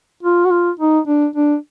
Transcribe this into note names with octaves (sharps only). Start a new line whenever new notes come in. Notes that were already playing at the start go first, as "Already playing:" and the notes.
F4
F#4
F4
D#4
D4
D4